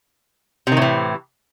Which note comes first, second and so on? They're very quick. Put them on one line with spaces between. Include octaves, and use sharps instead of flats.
C3 D#3 A2 E3